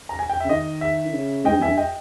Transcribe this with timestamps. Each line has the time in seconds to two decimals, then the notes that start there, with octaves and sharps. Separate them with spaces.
0.09 A#5
0.19 G#5
0.30 G5
0.40 C#3 E5
0.49 D#3 D#5
0.81 E5
1.08 D#3
1.13 C#3
1.45 G#2 D#5 G5
1.52 G2
1.59 E2 E5 G#5
1.67 G2
1.77 D#5 G5